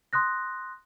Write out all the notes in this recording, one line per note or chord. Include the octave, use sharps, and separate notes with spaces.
C6 D#6 F#6 A#6